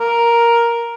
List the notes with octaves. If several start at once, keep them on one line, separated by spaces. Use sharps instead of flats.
A#4